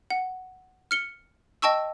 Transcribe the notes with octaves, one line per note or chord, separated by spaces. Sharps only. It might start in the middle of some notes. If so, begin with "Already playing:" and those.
F#5
F6 C#7 G7
D#5 G5 A5 C#6 E6